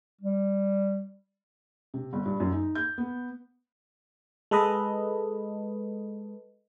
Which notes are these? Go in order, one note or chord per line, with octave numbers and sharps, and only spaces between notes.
G3
C3
G1
G2
F#2
D#4
G6
B3
G#3 A4 B4 D#5